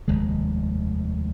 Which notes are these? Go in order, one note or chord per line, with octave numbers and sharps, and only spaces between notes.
F1 D#2 D#3 G#3